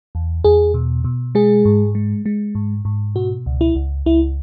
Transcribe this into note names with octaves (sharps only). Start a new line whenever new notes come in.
E2
E2 G#4
B2
B2
G#3 G#4
G#2
G#3
G#3
G#2
G#2
B2 F#4
C#2
E4
C#2
C#2 E4